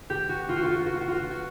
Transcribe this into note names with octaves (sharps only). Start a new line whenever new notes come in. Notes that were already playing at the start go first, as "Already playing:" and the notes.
G4
F#4
F4
F#4
F4
F#4
F4
F#4
F4
F#4
F4
F#4
F4
F#4